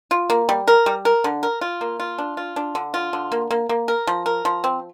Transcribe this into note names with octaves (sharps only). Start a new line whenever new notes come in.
F4
A#3
G3
A#4
G3
A#4
D3
A#4
F4
A#3
F4
D4
F4
D4
D3
F4
D3
A#3
A#3
A#3
A#4
F3
A#4
F3
C4